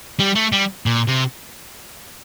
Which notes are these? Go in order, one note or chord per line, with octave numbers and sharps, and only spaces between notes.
G3
A3
G3
A#2
C3